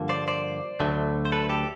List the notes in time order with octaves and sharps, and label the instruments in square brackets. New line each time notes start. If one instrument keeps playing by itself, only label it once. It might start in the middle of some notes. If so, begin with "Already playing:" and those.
Already playing: [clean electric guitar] G2 D3 F3 A#3
C5 D5
C5 D5
D2 D3 F#3 A3
C5
A4 B4
G4 A4